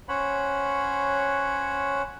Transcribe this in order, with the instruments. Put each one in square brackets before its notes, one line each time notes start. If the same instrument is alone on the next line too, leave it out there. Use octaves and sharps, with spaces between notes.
[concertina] C#4 C5 C#5 F#5 B5